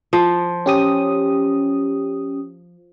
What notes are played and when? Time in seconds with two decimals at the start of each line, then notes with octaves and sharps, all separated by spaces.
0.13 F3
0.66 C#4 G4 D#6